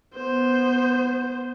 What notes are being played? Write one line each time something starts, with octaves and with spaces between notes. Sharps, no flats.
B3 C5